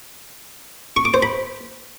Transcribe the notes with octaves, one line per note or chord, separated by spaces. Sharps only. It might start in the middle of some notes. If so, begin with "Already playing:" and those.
C#6
D6
C5
B5